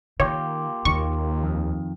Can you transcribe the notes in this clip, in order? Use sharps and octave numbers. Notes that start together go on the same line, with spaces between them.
D#3 A#3 F4 G4 C#5
D#2 D#3 C#6
F2